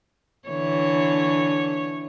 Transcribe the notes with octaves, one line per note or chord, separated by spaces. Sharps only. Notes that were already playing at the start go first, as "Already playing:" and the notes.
D3 E3 C#5